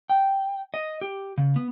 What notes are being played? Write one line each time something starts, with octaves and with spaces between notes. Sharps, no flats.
G5
D#5
G4
C#3
B3